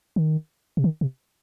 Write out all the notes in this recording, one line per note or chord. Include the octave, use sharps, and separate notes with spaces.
D#3
C3
D#3
C3